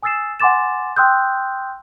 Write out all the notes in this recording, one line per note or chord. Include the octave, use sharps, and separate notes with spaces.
G#5 D#6 E6 A6 C7 E7
F#5 G#5 C6 D6 A6 E7
G5 C6 D#6 E6 F#6 G6